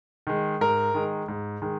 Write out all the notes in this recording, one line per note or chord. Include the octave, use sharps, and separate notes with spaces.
D#3 G#3
G#2 A#4
D#3 G#3
G#2
D#3 G#3